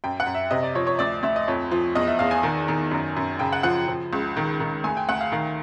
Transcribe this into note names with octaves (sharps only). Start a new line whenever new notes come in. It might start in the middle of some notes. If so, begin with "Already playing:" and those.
F#2 G5
F#5
F#2
E5
C3 D#5
D5
F3 C#5
C#5
D2 D5
D2 E5
D#5
F2 C#5
F3
E2 D#5
E5
E2 F5
G#5
D#3
D#3
F#2
F#2
C#3 G5
F#5
F3 F#5
F3
C#2
D#3
D#3
D2 G#5
G5
D2 F#5
F5
D#3 F5